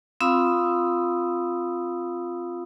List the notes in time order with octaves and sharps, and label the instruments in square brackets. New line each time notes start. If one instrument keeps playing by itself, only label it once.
[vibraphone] C4 F4 F5 B5 D#6 E6